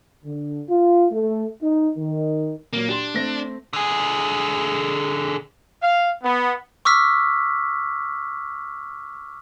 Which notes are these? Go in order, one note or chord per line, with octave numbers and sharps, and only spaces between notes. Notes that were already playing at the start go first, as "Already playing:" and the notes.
D3
F4
A3
D#4
D#3
A#2 F#3 A#3
D4 G4 C6
A3 C4 A#6
D3 G#4
F5
B3
C#6 D6 E6 F6 B6